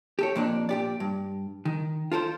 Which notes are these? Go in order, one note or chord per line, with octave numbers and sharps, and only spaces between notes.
G4 A4 C#5
F2 A#2 D4
A#2 G4 D5
G2
D#3
F4 A4 A#4 C5